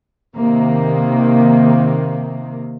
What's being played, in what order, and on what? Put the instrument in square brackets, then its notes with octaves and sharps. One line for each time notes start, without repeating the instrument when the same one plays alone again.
[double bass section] C3 D#3 A#3